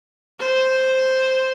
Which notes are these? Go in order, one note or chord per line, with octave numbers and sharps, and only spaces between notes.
C5